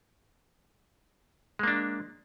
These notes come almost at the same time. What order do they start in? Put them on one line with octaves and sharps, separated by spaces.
G#3 A#3 D4